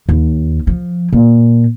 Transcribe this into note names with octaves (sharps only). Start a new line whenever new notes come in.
D#2
F3
A#2